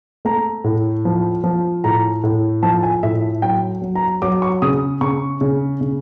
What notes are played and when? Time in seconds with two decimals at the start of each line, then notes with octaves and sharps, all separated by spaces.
0.25 A3 A#5
0.64 A2
1.05 F3
1.44 F3
1.84 A2 A#5
2.23 A2
2.63 F3 A5
2.83 G#5
3.03 A2 E5
3.42 F#3 G5
3.82 F#3
3.95 A#5
4.22 F#3 D6
4.42 C#6
4.62 C#3 D#6
5.01 C#3 C#6
5.41 C#3
5.81 C#3